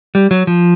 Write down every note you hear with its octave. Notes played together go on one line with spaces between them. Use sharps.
G3
F#3
F3